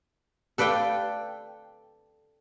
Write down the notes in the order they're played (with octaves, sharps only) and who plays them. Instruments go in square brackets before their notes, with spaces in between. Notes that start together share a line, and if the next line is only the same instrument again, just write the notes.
[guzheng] A4 B4 D5 F5 G5